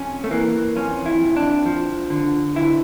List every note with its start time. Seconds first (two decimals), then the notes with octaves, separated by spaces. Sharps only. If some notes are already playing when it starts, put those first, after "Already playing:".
Already playing: F2 C#4
0.24 A3
0.31 E3 A#3
0.76 F2 C#4
1.06 E4
1.21 F2
1.36 D4
1.66 F3
2.10 D3
2.55 D2 E4